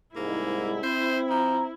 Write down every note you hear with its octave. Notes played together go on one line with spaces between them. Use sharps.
C2 G#2 A#3 E4
C4 C5
F3 A#5